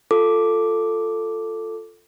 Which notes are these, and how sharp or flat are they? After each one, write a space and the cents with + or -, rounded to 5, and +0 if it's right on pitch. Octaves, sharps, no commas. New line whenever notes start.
F4 +0 A4 +10 D6 +0